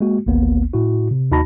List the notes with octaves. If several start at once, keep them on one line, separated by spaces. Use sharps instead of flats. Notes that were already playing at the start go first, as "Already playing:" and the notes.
G#3 A#3 F#4
G#1 D2 A#3 B3
A2 E4 F#4
C3
D#2 D#4 F#4 A5 B5 A#6